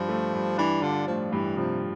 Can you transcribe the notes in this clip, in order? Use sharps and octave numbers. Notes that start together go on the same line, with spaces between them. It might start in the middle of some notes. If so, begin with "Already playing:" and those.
Already playing: G2 F3
A3
G2
E3 D4
D3 F4
A2 F3
G2 E3
C3 F3